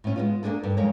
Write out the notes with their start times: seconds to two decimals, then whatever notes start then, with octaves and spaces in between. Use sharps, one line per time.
0.04 A2 C#4
0.16 G#3 B3 F4
0.43 A#3 C#4 D4 G#4 A4
0.64 G2
0.77 F2 G#3 A#4 C#5